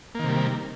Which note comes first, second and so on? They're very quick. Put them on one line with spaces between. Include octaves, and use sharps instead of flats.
A#3 D#3 C3 G3